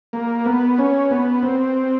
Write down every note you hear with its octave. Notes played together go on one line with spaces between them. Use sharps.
A#3
B3
C#4
B3
C4